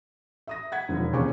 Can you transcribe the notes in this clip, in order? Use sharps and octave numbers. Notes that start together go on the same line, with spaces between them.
E5 D#6 A#6
F#5 G#6 B6
E1 D#3 F3
D#2 C3 C#4 G#4 C#6 D6